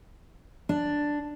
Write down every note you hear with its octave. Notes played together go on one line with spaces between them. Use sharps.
D4